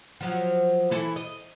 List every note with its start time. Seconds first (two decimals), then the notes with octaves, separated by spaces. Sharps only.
0.21 F3 F#3
0.91 E3 E4 A4
1.16 D#5